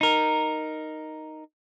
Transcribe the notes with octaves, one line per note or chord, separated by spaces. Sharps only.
D#4 A#4